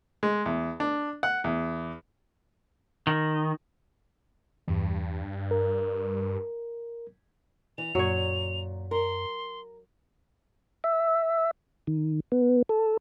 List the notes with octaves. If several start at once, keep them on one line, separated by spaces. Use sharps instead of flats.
G#3
E2
D4
F#5
E2
D#3
E2 G2
A#4
E3 F7
F#2 A#2 F#3 C#5
A#4 C6
E5
D#3
B3
A4